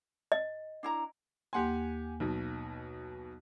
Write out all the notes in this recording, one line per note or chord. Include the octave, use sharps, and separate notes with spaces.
D#5
D4 E4 A#5
D#2 A#3 G4 F#5 G#5 C6
B1 B2 D#4